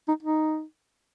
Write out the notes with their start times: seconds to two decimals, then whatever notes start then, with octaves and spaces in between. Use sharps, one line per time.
0.08 D#4
0.23 D#4